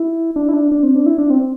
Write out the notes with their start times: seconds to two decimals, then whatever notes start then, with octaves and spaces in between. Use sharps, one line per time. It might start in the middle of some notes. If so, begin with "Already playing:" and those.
Already playing: E4
0.36 D4
0.49 E4
0.54 D4
0.72 D4
0.83 C4
0.95 D4
1.06 E4
1.18 D4
1.30 C4